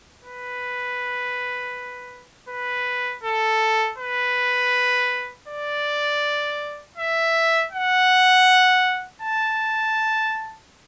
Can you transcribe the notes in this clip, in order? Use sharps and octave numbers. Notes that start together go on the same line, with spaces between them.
B4
B4
A4
B4
D5
E5
F#5
A5